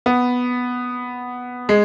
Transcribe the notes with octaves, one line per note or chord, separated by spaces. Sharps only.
B3
G#3